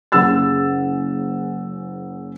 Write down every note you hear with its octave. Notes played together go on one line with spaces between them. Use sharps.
F#1 C#3 G#4 F#5 E6 A6